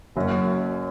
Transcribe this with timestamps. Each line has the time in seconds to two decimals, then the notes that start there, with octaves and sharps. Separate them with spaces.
0.16 F#1 F#2 F#3 C#4